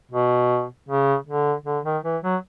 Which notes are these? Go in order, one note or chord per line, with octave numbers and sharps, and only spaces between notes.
B2
C#3
D3
D3
D#3
E3
F#3